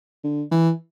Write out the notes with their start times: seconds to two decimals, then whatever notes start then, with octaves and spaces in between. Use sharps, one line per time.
0.24 D3
0.52 E3